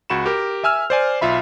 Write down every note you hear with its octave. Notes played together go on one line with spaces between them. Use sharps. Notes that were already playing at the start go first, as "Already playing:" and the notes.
C#2 F#4 B5 E7
G4 A#4
E5 G#5 E6 F6
C5 D5 G#5
B1 F4 E5 B5